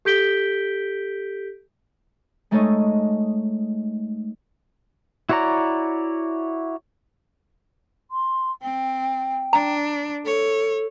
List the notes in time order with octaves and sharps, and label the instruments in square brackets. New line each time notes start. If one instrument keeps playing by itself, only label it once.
[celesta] G4 A4 G6 B6 D7 G7
[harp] G#3 A3 D#4 A4 C#5 D#5
[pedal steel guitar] E4 F#4 C#5 D5 A#5
[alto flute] C6
[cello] C4 [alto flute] G5
[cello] D4 [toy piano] A#5
[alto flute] A4 [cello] C#5